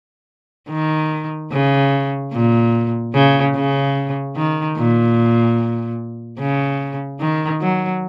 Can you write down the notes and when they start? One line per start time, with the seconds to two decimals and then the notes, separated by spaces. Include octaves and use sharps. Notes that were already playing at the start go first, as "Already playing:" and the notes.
0.70 D#3
1.51 C#3
2.33 A#2
3.14 C#3
3.55 C#3
4.36 D#3
4.77 A#2
6.39 C#3
7.20 D#3
7.61 F#3